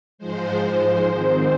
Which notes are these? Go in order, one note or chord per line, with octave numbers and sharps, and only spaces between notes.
G#2 F3 G#3 C5
G#2 D#3 G#3 C4